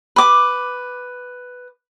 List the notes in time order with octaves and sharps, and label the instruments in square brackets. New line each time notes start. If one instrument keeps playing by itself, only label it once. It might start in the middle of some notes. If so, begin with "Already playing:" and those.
[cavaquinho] B4 D6